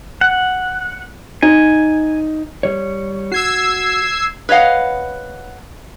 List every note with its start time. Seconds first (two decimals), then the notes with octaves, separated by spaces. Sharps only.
0.21 F#5
1.42 D#4 G#5
2.63 G3 C#5
3.32 F#4 E6 G#6 C7
4.49 B4 C#5 D#5 F5 F#5